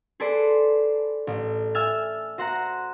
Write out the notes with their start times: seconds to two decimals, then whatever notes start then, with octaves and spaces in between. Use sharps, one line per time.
0.20 G#4 A4 B4 C5 D5
1.27 A1
1.75 E5 G#5 E6 F6 A6
2.38 F#4 C5 F#5 A#5